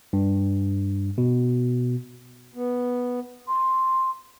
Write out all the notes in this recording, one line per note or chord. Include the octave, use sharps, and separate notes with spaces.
G2
B2
B3
C6